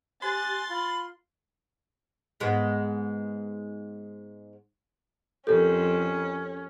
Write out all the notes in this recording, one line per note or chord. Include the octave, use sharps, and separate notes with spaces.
G4 G#5 C6 F#6 A6
F4 B5
G#2 G#3 B3
F2 C#4 G4 A4 A#4